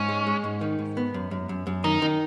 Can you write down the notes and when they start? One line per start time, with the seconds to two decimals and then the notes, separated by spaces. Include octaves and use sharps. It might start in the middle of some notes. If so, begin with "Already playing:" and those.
Already playing: G#2 C#4
0.09 G#3
0.27 G#3
0.44 G#2
0.61 D#3
0.79 G#2
0.97 B3
1.14 F#2
1.31 F#2
1.49 F#2
1.67 F#2
1.84 D#3 D#4
2.02 D#3